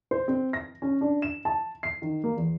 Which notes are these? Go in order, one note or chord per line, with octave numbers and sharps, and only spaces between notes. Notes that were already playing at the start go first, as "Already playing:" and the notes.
C5
C4
A#6
C#4
D4
E7
A5
C7
D#3
A#3
E2